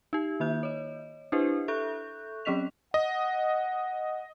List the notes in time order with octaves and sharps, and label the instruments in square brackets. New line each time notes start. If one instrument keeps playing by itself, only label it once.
[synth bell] D#4 G4
D#3 A#3 E5 G6
C#5 D#5
D4 E4 G4 B4 C5
A4 E5 C#6 F#6 G6
F#3 C4 C#4 D#5 B6 F7
[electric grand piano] D#5 [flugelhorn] F#5